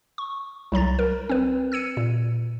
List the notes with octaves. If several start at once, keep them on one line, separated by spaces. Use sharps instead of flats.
C#6
C2 F#3 A#5 A6
A#4
C4 B4
E6 G#6 C#7 D#7
A#2